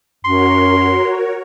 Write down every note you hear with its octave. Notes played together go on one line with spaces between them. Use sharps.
F#2 F#4 A#4 C#5 C6